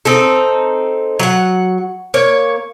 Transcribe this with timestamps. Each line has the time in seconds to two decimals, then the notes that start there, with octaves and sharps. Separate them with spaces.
0.05 C4 D#4 A4
1.19 F#3 F#5
2.14 A#3 C#5